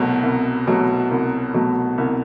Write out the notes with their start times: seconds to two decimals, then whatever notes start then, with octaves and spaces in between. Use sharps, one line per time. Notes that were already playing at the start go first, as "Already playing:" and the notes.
Already playing: C2 B2 F#3 A3
0.23 C2
0.67 B2 F#3 A3
1.11 C2
1.54 B2 F#3 A3
1.98 C2